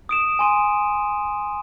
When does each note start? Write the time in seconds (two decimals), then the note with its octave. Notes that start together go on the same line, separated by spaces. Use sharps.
0.09 D#6 D7 E7
0.39 G#5 C6 D#7